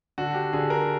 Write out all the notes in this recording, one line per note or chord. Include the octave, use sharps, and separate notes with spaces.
D3 F#4
G4
D3 G#4
A#4